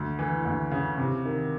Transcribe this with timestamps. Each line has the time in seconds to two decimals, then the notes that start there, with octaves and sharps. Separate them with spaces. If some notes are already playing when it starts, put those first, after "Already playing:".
Already playing: D2
0.19 E3
0.45 D2
0.71 C#3
0.98 C3
1.25 D#3